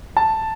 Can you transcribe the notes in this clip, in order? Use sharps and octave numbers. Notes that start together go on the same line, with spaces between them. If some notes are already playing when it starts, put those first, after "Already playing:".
A5